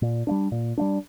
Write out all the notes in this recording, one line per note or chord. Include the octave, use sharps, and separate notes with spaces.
A#2
G3 A#3 D4
A#2
G3 A#3 D4